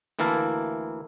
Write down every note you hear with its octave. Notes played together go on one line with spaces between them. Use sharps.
D2 E3 A#3 E4 F5 A5